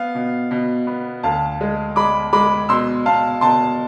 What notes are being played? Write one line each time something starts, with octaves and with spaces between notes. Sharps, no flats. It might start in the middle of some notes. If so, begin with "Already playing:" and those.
Already playing: B3 F5
B2
B2
B3
D2 F5 A5
G#3
G#3 B5 D6
G#3 B5 D6
B2 C6 E6
B2 F5 A5
B2 A5 C6